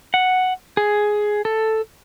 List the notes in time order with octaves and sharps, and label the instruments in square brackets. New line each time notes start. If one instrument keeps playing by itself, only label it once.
[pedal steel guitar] F#5
G#4
A4